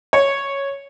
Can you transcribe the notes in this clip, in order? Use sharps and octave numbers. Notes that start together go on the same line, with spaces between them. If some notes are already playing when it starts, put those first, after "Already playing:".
C#5